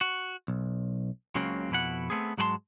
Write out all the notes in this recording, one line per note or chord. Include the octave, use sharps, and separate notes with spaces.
F#4
B1
C#2 C#3 F#3 A#3 C4
F2 B2 E4 F#5
A3 B3 C4 G#4
G#2 F#3 G#3 B4 A5 C6